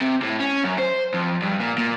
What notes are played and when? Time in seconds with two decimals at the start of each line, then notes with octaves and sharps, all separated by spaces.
0.01 C3
0.22 A2
0.40 C#4
0.64 F#2
0.79 C5
1.14 F2
1.42 G2
1.60 A#2
1.78 A#2